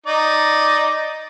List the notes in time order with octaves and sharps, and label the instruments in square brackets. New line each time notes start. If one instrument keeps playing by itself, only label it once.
[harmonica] D#4 D5